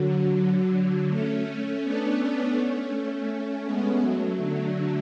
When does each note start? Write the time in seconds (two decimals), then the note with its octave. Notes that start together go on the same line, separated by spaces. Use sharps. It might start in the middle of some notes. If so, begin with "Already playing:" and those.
Already playing: D3 F#3
1.09 A3 C#4
1.82 B3 D4
2.19 B3 D4
2.55 A3 C#4
2.91 A3 C#4
3.28 A3 C#4
3.64 G#3 B3
4.00 F#3 A3
4.37 D3